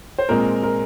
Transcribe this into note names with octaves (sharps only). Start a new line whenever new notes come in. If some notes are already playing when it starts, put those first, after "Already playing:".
C5
A#2 G#3 C4 A#4
A#4